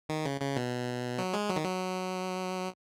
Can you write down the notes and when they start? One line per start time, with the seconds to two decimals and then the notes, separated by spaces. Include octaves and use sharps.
0.09 D#3
0.25 C#3
0.41 C#3
0.56 B2
1.18 F#3
1.34 G#3
1.50 F#3
1.56 D#3
1.65 F#3